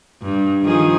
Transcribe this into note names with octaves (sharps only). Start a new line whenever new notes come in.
G2
D#3 F3 G#4